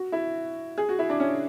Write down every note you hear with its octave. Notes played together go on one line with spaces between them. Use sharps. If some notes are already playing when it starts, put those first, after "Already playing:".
Already playing: F#4
E4
G#4
F#4
E4
D4
C#4